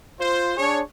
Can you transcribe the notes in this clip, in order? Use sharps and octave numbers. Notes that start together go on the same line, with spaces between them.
F4 C5
D4 G#4 C#5